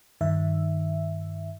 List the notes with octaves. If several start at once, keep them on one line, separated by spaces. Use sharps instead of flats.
G2 D#3 E5